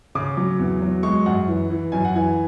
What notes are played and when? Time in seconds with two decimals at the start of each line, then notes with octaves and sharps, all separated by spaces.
0.15 C#3 D6
0.37 F#3
0.59 E2
0.82 F#3
1.03 G#3 C#6
1.26 F#2 F#5
1.48 E3
1.70 E3
1.92 F#2 G#5
2.05 F#5
2.15 E3 G#5